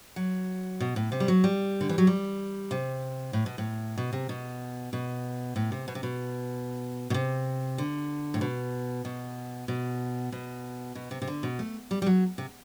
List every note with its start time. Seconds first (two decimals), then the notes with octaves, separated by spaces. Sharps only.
0.16 F#3
0.80 B2
0.96 A2
1.12 C3
1.20 G3
1.28 F#3
1.44 G3
1.81 D3
1.89 E3
1.98 F#3
2.07 G3
2.71 C3
3.33 A2
3.46 B2
3.58 A2
3.98 B2
4.13 C3
4.29 B2
4.93 B2
5.56 A2
5.72 C3
5.88 B2
5.95 C3
6.03 B2
7.10 B2
7.14 C3
7.78 D3
8.34 A2
8.41 B2
9.05 B2
9.68 B2
10.32 B2
10.95 B2
11.11 C3
11.22 C3
11.28 D3
11.43 B2
11.59 A3
11.91 G3
12.02 G3
12.06 F#3
12.38 C3